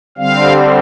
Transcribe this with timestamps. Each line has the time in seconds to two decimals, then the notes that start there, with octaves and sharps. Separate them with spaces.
0.18 D3 G3 C4 F5